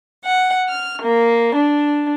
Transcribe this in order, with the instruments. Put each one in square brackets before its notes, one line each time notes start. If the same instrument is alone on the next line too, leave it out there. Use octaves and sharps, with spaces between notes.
[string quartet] F#5
F6
A#3
D4